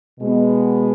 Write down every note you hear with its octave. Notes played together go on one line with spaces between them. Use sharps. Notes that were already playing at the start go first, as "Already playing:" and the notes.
B2 G#3 B3